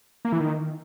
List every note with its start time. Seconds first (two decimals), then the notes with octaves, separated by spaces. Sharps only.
0.25 A#3
0.32 E3
0.40 D#3